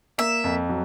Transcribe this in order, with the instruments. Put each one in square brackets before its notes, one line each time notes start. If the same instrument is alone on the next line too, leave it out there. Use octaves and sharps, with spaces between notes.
[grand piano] A#3 [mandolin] E5
[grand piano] F2
F#3